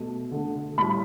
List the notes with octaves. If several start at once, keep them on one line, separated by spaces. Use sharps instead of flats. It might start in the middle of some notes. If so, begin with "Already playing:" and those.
Already playing: B2 A3
D3 A3
A2 G3 B5